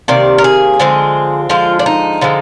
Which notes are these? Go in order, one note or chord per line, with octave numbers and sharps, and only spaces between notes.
C3 D#3 A#3 D5
A#4
G#4
D3 F3 G#3 C4
D3 F3 G#3 F4
D4
D#4
D3 F3 G#3